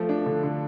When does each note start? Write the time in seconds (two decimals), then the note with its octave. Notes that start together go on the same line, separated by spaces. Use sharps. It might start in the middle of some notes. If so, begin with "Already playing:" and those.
Already playing: F3 A3
0.09 D4
0.26 D3
0.43 D3